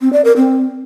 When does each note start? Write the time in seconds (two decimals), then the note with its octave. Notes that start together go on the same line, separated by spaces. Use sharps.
0.01 C4
0.13 D5
0.25 A#4
0.37 C4